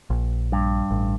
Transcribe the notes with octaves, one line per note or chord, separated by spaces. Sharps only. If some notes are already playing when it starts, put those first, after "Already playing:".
A#1
G2
A1